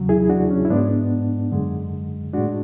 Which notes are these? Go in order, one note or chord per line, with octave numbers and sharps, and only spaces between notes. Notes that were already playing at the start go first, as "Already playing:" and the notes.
Already playing: E2 C#3 F#3
E4 G#4
D4 F#4
C#4
E4
G#2 G#3 B3 D4
F#2 D3 G#3
A2 G#3 D4 F#4